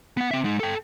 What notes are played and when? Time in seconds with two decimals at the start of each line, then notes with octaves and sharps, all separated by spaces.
0.17 B3 F#5
0.31 C4 E5
0.44 G#3 D#4
0.60 A4 G5